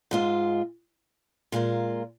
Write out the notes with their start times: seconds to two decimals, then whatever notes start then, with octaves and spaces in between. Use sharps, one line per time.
0.11 G#2 G#3 F4
1.52 A#2 G#3 F4 A#4